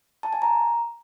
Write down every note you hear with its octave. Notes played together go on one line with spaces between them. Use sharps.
A5
G#5
A#5